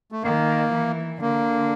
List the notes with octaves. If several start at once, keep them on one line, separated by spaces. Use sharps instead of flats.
A3
D#3 A#3
E3
D3 A#3